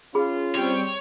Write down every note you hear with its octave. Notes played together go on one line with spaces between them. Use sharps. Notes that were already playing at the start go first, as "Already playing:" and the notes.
C#4 F4 G#4 B5
G3 C4 C#5 G5